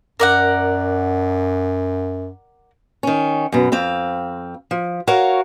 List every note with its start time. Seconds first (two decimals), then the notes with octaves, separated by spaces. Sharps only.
0.20 F#2 A#4 D5 F#5
3.03 D#3 C#4
3.52 F#2 B2
3.72 F2 C4 F5
4.71 F3
5.07 F#4 A#4 C#5 F5